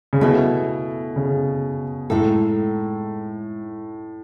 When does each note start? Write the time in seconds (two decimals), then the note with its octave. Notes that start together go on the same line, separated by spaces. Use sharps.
0.13 C#3
0.21 B2 A3 E4 A4
1.16 C#3
2.10 A2 G#3 D#4 A4